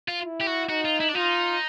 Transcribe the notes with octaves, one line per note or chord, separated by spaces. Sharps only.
F4
E4
G4
F#4
D#4 F#4
F4
E4
D4
D#4 F4